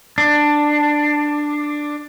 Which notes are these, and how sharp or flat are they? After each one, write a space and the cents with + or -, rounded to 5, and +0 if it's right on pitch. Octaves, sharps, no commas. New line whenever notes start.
D4 +10